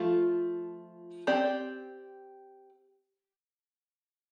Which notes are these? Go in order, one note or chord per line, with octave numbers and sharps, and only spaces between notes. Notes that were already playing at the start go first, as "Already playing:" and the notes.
Already playing: F3 A3 F4
C4 G4 D5